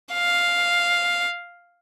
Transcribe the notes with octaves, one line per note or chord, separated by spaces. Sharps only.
F5